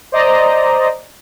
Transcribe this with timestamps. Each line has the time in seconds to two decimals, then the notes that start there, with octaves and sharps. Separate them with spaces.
0.12 C5 D5 D#5 A#5